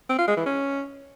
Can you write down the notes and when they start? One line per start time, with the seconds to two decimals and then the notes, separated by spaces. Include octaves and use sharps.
0.09 C4
0.18 F4
0.28 G#3
0.37 E3
0.46 C#4